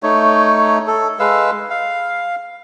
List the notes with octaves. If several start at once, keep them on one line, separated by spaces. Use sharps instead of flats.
A3 D#4 C#5
A4
G#3 B4 F5 E6
F5